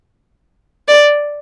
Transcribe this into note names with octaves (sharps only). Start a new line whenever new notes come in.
D5